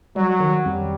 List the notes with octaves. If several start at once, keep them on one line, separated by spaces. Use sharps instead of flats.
F#3 G3
D#3
F2 G3